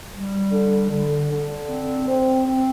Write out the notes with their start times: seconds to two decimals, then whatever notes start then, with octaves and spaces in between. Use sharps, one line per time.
0.12 G3
0.52 D3
0.90 D3
1.29 D3
1.68 C4
2.06 C4
2.46 C4